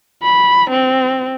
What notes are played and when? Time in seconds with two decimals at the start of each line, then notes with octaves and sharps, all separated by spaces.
0.23 B5
0.71 C4